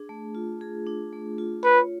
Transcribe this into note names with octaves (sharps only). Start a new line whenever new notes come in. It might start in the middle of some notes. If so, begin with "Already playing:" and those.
Already playing: D4 G#4
A3
F4
G#4
D4
A3
F4
B4 C#5